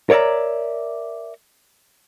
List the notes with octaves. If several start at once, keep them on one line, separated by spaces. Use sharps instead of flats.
A#4 C#5 D5 E5 A#5